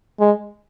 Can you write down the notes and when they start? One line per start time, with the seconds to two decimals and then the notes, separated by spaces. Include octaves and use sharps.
0.20 G#3